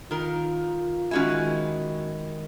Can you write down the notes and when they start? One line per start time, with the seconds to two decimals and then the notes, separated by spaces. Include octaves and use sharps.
0.11 D#3 F4 A#4
1.11 D#3 G#3 C#4 E4 F#4 G#5